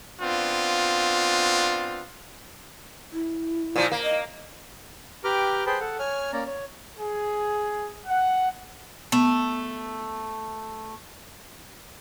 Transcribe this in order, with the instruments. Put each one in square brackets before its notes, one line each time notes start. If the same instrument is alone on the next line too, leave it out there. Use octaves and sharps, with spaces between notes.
[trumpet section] B3 C4 D4 F4
[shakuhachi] E4
[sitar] A#2 F3
A#3
[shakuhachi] D#5
[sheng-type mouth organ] G4 B4 G5 A#5 D6 F6
G#4 B4 C5 G5 A5 B5
A4 F#5
C#5 G#5 F6
A#3 C#4 D5 A#5
C#5
[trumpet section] G#4
F#5
[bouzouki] A3 [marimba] B3